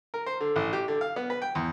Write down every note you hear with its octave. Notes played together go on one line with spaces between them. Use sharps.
A#4
C5
D3
A1
G4
D3
F5
B3
B4
G5
E2